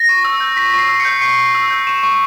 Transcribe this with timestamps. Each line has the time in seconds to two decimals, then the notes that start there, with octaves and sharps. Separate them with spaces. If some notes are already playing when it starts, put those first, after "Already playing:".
Already playing: A#6
0.09 C#6
0.25 E6
0.40 G6
0.56 C#6 B6
0.74 C#6 C7
0.89 E6
1.00 C#7
1.05 G6
1.21 C#6 C7
1.38 C#6
1.55 E6
1.70 G6
1.87 C#6 E7
2.03 C#6